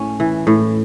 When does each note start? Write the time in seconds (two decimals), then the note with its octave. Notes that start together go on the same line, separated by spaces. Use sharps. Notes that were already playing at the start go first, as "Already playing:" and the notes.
Already playing: A2 A3 C#4
0.20 E3
0.47 A2